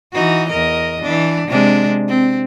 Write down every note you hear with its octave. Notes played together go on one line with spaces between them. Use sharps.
E3 D#4 F#4
E2 A#4 D#5
E3 D4
C3 G#3 D4
C4